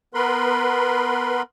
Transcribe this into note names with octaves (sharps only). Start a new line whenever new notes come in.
B3 A#4 B4 B5 C6